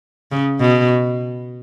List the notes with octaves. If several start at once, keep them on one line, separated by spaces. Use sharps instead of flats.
C#3
B2